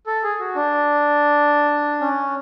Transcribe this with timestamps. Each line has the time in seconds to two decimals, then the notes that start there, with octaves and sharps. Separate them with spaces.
0.07 A4
0.23 G#4
0.40 F#4
0.56 D4
2.01 C#4